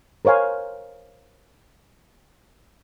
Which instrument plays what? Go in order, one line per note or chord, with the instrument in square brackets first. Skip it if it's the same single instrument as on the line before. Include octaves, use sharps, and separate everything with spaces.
[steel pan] A#4 C5 C#5 F5 G#5